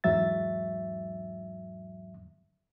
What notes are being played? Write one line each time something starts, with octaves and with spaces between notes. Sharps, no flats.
E2 G#2 F#3 E5 A6